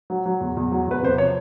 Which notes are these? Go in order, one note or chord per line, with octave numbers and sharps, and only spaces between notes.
F#3
F#3
E2
E2
F#3
E2 B4
C3 C5
F3 C#5